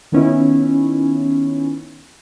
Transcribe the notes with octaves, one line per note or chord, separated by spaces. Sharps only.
D#3 B3 C#4 D#4 E4